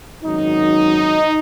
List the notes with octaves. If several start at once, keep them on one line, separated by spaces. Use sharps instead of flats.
G#1 F#2 D#3 F#3 D#4